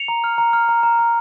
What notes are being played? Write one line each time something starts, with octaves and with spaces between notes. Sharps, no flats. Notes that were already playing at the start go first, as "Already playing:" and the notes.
Already playing: C#7 F7
A#5
F6
A#5
F6
A#5
A#5
A#5